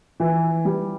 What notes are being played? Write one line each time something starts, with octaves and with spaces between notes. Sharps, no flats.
E3
G3